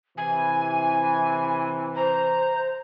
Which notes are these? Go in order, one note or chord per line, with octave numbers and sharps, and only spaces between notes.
C3 E3 G#5
C5 A#5